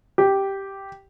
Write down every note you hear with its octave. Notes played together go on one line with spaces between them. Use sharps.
G4